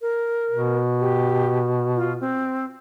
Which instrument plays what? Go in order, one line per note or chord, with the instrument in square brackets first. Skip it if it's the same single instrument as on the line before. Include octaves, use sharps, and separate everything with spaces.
[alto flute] A#4
[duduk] B2
[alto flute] G4
F4
C4